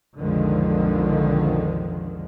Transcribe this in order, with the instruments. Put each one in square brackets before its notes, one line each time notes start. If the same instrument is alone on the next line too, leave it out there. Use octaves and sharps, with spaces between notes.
[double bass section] B1 F2 D3 D#3 F3 G#3